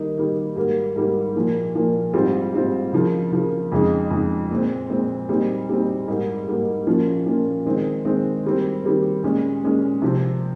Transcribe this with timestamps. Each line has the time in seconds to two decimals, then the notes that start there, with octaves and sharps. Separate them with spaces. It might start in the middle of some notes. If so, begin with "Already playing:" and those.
Already playing: D#3 G3 A#3 D#4
0.17 D#3 G3 A#3 D#4
0.56 G#2 G3 A#3
0.96 G#2 G3 A#3
1.35 A#2 F3 A#3
1.75 A#2 F3 A#3
2.14 G#2 G3 C4 F4
2.53 G#2 G3 C4 F4
2.93 C#3 F3 A#3
3.32 C#3 F3 A#3
3.72 F2 C#3 G#3 D#4
4.11 F2 C#3 G#3 D#4
4.50 A#2 G#3 C4
4.90 A#2 G#3 C4
5.29 A#2 G3 C4 D#4
5.69 A#2 G3 C4 D#4
6.08 G#2 G3 A#3 D#4
6.47 G#2 G3 A#3 D#4
6.87 A#2 F3 A#3 C#4 F4
7.26 A#2 F3 A#3 C#4 F4
7.65 D#3 G#3 C4 D#4
8.05 D#3 G#3 C4 D#4
8.45 D#3 G3 C4
8.84 D#3 G3 C4
9.23 A#2 G#3 C#4
9.63 A#2 G#3 C#4
10.02 C3 F3 C4